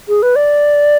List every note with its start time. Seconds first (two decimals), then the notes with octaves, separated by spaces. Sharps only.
0.09 G#4
0.23 B4
0.36 D5